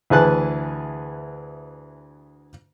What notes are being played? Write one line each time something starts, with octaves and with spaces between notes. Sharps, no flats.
D2 E3 G#4 B4 A5 F#6